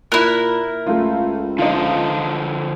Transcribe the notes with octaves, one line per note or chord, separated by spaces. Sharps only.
A#2 E4 A#4 F#6
C#2 A3 F4
D3 F3 D#4 F4